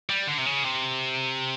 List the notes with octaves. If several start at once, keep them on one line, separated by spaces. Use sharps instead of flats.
G3
D3
C3
C#3
C3